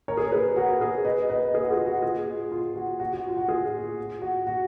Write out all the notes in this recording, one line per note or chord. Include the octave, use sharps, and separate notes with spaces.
A#4 C#5
G#4
A#4
G#4 B4
F#4 A#4
G#4 B4
B4 D#5
B4 D#5
G#4 B4
F#4
F4 G#4
F#4
F4 G#4
F4
F#4
F#4
F#4
F4
F#4
F4 G#4
F#4
F#4